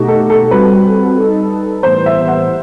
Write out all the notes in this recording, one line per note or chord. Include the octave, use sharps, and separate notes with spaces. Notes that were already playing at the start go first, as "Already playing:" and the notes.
Already playing: B2 A3 D#4 F#4 G4
A4
A4
G3 C4 F#4 A4 B4
G3 D#4 A4
A2 E3 G3 B3 C5
E5
F#5